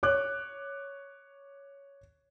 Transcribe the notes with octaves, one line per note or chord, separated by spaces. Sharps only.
C#5 D6 F#6